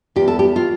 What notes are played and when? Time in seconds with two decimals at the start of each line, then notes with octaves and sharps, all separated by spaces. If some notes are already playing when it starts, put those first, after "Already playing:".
0.16 E2 G4
0.28 A4
0.39 G4
0.56 F4